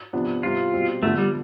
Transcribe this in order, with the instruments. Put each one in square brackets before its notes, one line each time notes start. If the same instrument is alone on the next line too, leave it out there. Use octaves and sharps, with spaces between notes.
[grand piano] C3 F3 B3 D4
[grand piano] C3 G3 C4 E4 [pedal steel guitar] F4
[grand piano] B2 G3 C4
[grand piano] D3 F3 B3 [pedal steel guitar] A3
[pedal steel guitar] G3